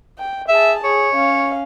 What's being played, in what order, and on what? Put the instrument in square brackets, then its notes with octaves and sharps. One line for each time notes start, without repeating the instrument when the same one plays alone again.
[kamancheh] G5
[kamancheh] G#4 A5 [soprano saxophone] E5
[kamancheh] G#4 [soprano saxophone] C#5
[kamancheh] C#4 F5